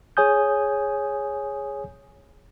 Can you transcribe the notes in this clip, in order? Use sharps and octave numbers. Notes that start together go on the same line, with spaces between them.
G#4 C#5 G#5 D#6 G6